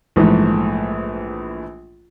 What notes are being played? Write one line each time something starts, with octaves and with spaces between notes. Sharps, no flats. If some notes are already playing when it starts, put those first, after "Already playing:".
A#1 G#2 E3 A3